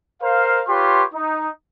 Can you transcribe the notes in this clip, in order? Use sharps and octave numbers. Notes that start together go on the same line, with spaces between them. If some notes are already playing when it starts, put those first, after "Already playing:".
A#4 C5 F5
F4 G4 B4 C#5 C6
D#4